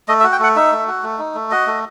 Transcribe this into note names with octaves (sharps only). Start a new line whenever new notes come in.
A3 D#5
E5
F#4
G5
A3 F#5
D#4 E5
A3
F#4
A3
D#4
A3
F#4 D#5
A3